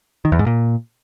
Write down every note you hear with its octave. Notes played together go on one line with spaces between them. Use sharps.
D#3
E2
G#2
A#2